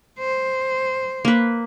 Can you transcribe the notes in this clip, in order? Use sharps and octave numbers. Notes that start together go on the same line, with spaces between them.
C5
A#3 B4